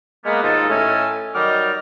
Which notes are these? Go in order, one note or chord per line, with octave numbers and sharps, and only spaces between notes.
G#3 A#3 B3
D#2 G#2 D#4 F4 A4
A2 A3 C#4 A4 D#5 G#5
D#3 F#3 G3 D#5 D6 F6